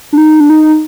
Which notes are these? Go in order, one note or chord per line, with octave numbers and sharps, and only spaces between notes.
D4
D#4
D4
D#4